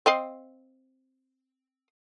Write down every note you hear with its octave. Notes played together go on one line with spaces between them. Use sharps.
C4 D#5 F5